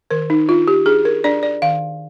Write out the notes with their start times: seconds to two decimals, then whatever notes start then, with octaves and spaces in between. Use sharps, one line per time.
0.11 D#3 A#4
0.30 D#4
0.48 D4 F4
0.68 G4
0.86 D4 G#4
1.05 A#4
1.24 D4 D5
1.43 D5
1.62 D#3 F5